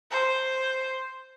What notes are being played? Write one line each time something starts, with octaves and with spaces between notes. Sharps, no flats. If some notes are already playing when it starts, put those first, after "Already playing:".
C5